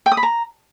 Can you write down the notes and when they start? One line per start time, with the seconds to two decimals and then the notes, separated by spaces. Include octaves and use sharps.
0.06 G5
0.12 D#6
0.17 B5
0.23 A#5